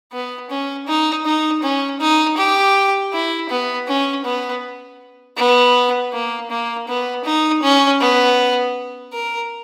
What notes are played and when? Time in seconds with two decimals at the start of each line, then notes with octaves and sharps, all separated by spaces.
0.12 B3
0.50 C#4
0.87 D#4
1.25 D#4
1.63 C#4
2.00 D#4
2.37 G4
3.13 E4
3.49 B3
3.87 C#4
4.25 B3
5.37 B3
6.13 A#3
6.50 A#3
6.88 B3
7.25 D#4
7.62 C#4
8.00 B3
9.13 A#4